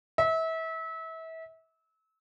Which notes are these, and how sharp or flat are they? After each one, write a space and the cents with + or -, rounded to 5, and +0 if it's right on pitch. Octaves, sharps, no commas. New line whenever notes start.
E5 -30